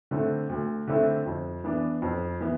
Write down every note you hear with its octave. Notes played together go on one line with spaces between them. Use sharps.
D3 A3 C4 E4
D2
D3 A3 C4 E4
F2
E3 B3 D4
F2
E3 B3